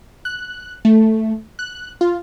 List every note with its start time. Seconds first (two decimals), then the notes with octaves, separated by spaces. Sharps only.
0.25 F#6
0.85 A3
1.59 F#6
2.01 F4